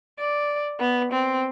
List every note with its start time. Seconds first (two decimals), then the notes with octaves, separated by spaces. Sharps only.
0.20 D5
0.80 B3
1.12 C4